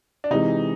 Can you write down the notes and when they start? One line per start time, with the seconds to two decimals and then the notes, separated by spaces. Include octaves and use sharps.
0.24 D4
0.30 C3 E3 G#3 D#4